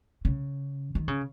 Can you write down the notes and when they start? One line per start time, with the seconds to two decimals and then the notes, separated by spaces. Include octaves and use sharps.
0.25 C#3
0.95 D#3
1.08 C#3